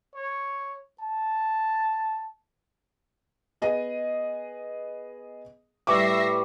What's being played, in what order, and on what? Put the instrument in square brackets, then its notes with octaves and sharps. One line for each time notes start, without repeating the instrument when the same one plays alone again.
[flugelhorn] C#5
A5
[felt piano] B3 G#4 D#5
[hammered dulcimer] A2 G3 B4 [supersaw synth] E5 A#6 C7 [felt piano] C#6 D6